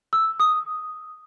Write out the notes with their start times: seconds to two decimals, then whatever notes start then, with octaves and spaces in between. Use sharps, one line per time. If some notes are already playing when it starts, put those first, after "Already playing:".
0.13 E6
0.40 D#6